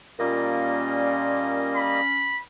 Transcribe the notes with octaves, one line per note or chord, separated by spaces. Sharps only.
A#2 G3 A#3 C#4 D#5
B5